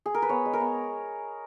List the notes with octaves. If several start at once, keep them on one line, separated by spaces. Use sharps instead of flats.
G#4
A#4
B4
B3 C#5
G#3
A#4
B3